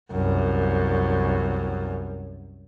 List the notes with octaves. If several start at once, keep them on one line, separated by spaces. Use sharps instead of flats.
C2 F#2